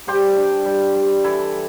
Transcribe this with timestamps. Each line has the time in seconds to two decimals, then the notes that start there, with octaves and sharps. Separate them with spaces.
0.07 G3 G4 C5
0.36 D4
0.65 G3
0.95 G3
1.24 E3 E4 A4